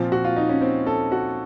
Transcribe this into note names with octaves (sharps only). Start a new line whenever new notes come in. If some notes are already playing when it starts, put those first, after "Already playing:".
Already playing: A#2 F3 C4
F#4
F4
D#4
C#4
C4
A4
F#4